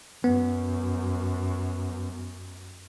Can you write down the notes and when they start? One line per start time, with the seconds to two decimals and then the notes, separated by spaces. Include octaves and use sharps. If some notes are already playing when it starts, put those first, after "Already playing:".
0.24 F#2 B3